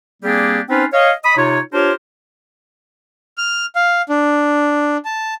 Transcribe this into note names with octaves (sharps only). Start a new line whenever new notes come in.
G3 A#3 C4 D4 G4 G#4
C4 C#4 D#4 F4 B4 C5
C#5 D#5 F5
D#5 B5 D#6
C3 D#4 F4 C#5
D4 F4 G4 A#4 C5 C#5
F6
F5
D4
A5